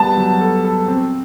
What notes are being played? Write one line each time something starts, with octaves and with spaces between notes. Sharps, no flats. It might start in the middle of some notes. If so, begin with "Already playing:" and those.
Already playing: G3 B3 A5
F#3
A4
A4
C4